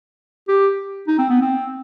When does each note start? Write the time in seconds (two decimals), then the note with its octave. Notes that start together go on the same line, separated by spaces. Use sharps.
0.48 G4
1.08 D#4
1.18 C4
1.30 B3
1.41 C4